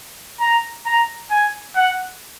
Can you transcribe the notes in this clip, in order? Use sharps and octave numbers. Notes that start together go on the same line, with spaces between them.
A#5
A#5
G#5
F#5